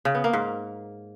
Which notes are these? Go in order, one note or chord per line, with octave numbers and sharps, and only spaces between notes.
C#3
B3
A#3
G#2